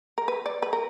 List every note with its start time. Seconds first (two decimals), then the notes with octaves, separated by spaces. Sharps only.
0.18 A#4
0.28 B4
0.46 D5
0.62 B4
0.73 A#4